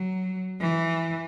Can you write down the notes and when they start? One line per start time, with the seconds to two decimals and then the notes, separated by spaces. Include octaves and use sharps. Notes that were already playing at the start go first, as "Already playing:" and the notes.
Already playing: F#3
0.61 E3